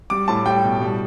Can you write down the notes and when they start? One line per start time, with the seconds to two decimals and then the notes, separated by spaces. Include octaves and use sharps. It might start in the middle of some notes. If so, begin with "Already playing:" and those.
0.10 G3 D6
0.28 A2 A5
0.46 G3 G5
0.64 B2
0.81 G3